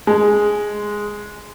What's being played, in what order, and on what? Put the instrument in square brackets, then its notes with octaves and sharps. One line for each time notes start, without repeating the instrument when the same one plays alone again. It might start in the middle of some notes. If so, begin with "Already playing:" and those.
[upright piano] G#3